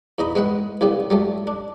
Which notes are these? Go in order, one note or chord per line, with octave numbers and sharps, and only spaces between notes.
E2 D#4 D#5 B5
G#3 B3 B4 F#5
C2 C#3 G3 B3
F#3 G3 A3
D4